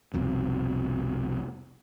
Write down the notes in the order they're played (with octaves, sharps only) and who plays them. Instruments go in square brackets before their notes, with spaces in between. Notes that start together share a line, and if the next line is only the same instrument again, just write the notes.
[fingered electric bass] F1 C2 F2 B2